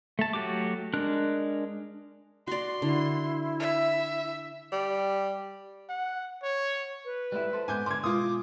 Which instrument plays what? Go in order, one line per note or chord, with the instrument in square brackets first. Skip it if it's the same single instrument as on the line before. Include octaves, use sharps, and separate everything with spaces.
[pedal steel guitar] A3 A5
F#3 A3 F#4 G4 D6
G#3 D4 A#4 F#6
[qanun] F#4 D5 [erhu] C6
[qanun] D3 [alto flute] E4
[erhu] E5
[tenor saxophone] G3
[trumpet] F#5
C#5
[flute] B4
[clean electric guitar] G3 A3 E4
A4 C5
[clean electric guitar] G#2 B3 [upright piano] G#5 D6 G6
[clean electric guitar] D3 A#4 C6 [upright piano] D6 G#6
[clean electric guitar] B2 G#3 [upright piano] F4 D#6 [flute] D6